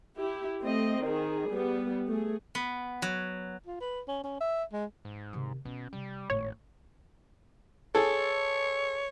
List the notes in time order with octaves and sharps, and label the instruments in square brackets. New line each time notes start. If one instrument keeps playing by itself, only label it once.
[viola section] E4 G4
A3 C4 D#5
D#3 G#4
G3 B3
A3 G#4
[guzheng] B3
F#3
[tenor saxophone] F4
B4
C#4
C#4
E5
G#3
[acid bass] G#2
[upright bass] C3 D#3
[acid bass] B2 [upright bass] C#4
[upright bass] C3 [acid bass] G3
[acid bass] G#1 [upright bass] A2 [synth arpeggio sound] C#5
[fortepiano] G#4 A4 [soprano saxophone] C#5